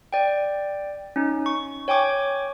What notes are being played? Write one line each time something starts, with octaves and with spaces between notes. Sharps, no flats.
D5 G5
C#4 D#4
C#6
C#5 G5 G#5 C#6 D6